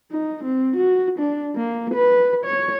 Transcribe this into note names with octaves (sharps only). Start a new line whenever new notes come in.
D#4
C4
F#4
D4
A#3
B4
C#5